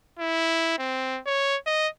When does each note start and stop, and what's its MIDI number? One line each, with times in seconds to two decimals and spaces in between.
0.19 0.76 64
0.78 1.20 60
1.26 1.56 73
1.66 1.88 75